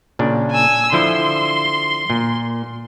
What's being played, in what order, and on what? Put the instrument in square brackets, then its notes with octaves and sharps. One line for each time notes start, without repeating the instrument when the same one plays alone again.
[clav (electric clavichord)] A#2 C#3 D4
[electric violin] G#5 E6
[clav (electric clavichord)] D3 F3 E4 [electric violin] C6
[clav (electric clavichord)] A#2